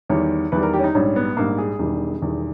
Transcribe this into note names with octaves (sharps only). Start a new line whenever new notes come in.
E2 D#3 G3 C#5
E2 D#3 G3 B4
A#4
G4
C#4
D#4
A#1 G#2 G3 C#4
B3
A#1 G#2 G3 A#3
G#4
E1 E2 D#3 G3
E1 E2 D#3 G3